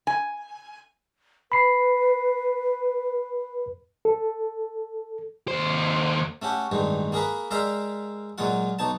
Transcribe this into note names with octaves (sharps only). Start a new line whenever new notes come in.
G#5
B4 B5 C7
A4
D#2 C5
A3 C#4 F#4 G4
A1 G2 D#3 G#3
A#3 G#4 A#4 B4
G#3 A#4 D5 E5 F5 G5
A#2 F#3 G#3 F4 F#5
B1 D#4 A5